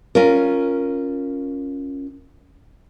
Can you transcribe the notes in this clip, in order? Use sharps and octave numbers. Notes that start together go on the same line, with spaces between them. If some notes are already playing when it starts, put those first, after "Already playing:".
C#4 F4 A#4